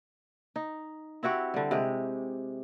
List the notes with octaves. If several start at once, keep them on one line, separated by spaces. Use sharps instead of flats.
D#4
C4 E4 F#4 G4
D3 G3
C3 G#3 G4